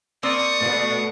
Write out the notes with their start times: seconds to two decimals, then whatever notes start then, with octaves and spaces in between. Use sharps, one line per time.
0.23 A#3 C4 D5 C#6 D#6
0.59 B2 A3